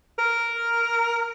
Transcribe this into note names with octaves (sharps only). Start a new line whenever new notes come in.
A#4